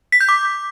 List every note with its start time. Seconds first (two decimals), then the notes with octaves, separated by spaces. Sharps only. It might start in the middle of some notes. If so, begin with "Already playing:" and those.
0.12 B6
0.21 G6
0.29 D6